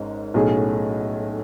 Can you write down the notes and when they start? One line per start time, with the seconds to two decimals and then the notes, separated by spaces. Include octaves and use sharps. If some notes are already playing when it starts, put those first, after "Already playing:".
Already playing: G#1 G#2 G#3 C#4
0.34 B1 A2 F#3 C#4 G#4